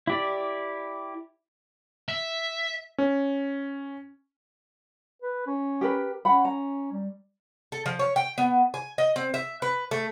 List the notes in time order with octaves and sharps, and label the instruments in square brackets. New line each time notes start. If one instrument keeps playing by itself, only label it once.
[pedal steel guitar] E4 G4 D5
[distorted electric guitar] E5
[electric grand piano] C#4
[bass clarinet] B4
C#4
[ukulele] G4 A#4 B4
[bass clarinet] C#4 [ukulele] F#5 B5
[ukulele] A#5
[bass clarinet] G3
[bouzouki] A4
F3
C#5
G5
B3
G#5
D#5
C4
E5
B4
A3